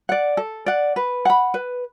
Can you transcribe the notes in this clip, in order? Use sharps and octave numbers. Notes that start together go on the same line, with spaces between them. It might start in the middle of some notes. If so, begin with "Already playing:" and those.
D5 F#5
A4
D5 F#5
B4
F#5 B5
B4